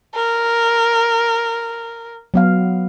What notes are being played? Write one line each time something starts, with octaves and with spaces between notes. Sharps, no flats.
A#4
F#3 B3 F5